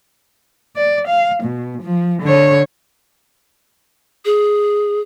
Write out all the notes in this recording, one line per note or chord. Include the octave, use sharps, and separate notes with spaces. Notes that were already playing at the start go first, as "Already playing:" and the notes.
D5
F5
B2
F3
D3 C#5
G#4